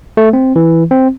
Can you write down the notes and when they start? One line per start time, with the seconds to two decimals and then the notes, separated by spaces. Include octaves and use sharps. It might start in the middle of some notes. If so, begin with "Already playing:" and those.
0.17 A3
0.33 C4
0.56 E3
0.91 C4